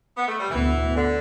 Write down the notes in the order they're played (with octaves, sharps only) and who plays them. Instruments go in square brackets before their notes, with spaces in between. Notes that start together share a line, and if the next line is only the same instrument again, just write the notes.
[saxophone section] B3
A3
G3
[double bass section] D2 D3 B3 [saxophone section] E3
[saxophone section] D3